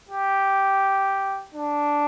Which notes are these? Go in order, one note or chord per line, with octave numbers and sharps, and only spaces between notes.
G4
D4